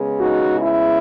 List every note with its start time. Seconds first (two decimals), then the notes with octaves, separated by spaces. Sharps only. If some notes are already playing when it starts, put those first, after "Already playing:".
Already playing: C#3 G#3 B3
0.21 D#4 F#4
0.61 E4